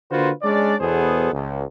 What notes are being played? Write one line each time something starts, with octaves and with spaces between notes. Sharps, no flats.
D3 A#3 F4 F#4 B4 C5
G#3 C#4 D4 D5
E2 B2 B3 G#4 A4 C5
C#2